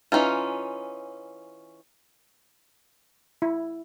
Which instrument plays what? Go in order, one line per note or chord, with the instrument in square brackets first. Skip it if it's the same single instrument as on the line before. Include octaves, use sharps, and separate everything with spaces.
[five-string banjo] E3 C#4 D#4 F4
[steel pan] E4